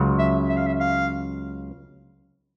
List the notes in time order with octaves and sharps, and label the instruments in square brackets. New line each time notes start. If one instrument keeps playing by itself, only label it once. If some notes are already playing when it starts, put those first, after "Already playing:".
Already playing: [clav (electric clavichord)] C#2 C#3 F#3
[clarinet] E5
E5
F5
E5
F5